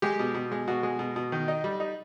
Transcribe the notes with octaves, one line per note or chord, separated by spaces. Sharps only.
G#3 G4
B2
B2
G#3
B2 F#4
G#3
B2
B2
D#3
D#4
G3
D#4